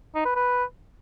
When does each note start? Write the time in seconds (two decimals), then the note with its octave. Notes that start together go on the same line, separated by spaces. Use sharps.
0.15 D#4
0.25 B4
0.36 B4